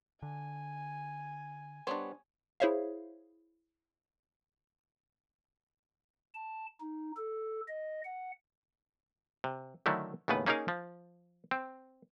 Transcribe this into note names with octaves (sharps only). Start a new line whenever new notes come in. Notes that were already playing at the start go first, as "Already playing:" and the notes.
D3 G#5
G3 B3 D4 C5 C#5
E4 G#4 C5 C#5 E5 F5
A5
D#4
A4
D#5
F#5
C3
D3 D#3 F#3 A3 E4
D#2 A2 C#3 B3 B4
A#3 C#4 D#4 G#4 A#4 F5
F3
C4